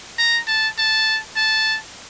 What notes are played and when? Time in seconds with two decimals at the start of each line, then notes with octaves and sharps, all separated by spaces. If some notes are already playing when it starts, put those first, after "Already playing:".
0.19 A#5
0.47 A5
0.78 A5
1.36 A5